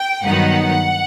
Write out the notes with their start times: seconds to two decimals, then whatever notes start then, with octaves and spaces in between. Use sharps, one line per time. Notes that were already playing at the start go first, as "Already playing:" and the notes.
Already playing: G5
0.24 G2 D#3 F#3 B3 D#4 F#5